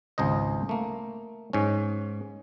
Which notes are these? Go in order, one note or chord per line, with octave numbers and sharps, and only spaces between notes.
G#1 C#2 C5 D#5
A3 A#3
G#2 C#4